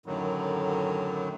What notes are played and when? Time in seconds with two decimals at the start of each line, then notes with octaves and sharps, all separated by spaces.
0.06 F#2 A2 D3 D#3 F#3